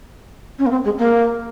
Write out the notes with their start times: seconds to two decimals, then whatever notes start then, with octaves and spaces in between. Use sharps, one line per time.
0.59 C#4
0.66 A#3
0.71 C4
0.84 G#3
0.98 A#3